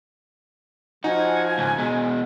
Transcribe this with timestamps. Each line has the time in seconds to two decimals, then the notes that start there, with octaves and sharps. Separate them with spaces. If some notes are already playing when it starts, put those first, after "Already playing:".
1.04 F3 D#4 F#4 G#5
1.58 C#2 G#2
1.78 B2 G#3